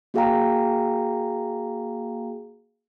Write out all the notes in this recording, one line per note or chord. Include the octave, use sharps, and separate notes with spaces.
A#3 F#4 G#4 F5 G5 A#5